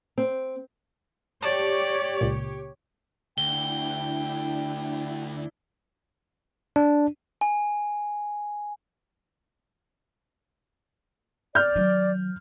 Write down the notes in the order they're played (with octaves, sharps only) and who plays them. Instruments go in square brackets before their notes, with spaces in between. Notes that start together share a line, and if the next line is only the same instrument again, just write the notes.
[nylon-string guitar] C4
[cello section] G4 C#5 [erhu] D5 [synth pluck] A5
[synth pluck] C#2 A#2
[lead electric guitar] D2 [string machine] D4 E4 [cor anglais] G5 [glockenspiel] G7
[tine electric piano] D4
[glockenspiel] G#5
[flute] D5 [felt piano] F6 G6
[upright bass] D#3 F#3